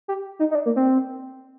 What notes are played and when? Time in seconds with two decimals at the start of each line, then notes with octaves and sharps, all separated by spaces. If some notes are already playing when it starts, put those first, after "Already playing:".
0.08 G4
0.39 D#4
0.51 D#4
0.55 D4
0.66 A#3
0.76 C4